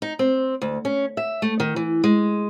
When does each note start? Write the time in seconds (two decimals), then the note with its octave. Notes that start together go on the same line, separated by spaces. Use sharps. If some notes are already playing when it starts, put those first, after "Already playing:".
0.02 D#4
0.19 C4
0.62 D2
0.85 C#4
1.17 E5
1.42 A3
1.60 D#3
1.76 E3
2.04 G#3